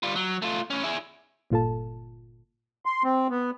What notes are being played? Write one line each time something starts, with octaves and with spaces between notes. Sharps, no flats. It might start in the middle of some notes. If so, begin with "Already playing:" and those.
G3 F4
F#3
A3 F4
A2 C#4
E4 G#4
G1 A#2 F4 A4 A5
C6
C4
B3